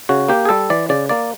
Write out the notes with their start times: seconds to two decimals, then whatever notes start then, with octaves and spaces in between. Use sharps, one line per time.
0.09 C#3 F#4
0.28 A#3 G4
0.45 G#4
0.49 G3 A4
0.70 E3 D5
0.89 C#3 D5
1.09 A#3 D5